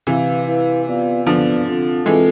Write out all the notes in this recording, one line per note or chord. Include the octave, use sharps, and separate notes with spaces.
C3 E3 E4 B4 F5
E4 B4 F5
B3 F4 B4 D5 F5
D3 F3 B3 F4 B4 D5 F5
C4 F4 A4
E3 G#3 C4 F4 A4